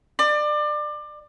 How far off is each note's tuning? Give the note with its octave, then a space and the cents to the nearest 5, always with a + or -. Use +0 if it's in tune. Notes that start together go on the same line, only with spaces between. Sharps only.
D5 +25